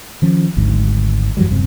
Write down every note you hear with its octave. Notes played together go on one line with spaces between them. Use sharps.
D#3 F3 C#4
G#1 D2 G#2
F#2 E3 F#3 G3
D#1 F#2 C3